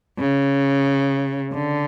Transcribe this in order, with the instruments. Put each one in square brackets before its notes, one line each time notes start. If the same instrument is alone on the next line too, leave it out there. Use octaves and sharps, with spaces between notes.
[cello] C#3
D3